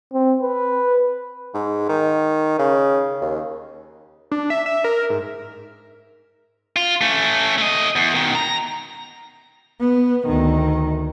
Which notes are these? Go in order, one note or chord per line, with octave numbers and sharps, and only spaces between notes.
C4
B4
G#2
D#3
C#3
D#2
D4
E5
E5
A#4
G#2
F4
A3 C#4
A3 D#5
E2
B2 D#3
A#5
B3
D2 D#3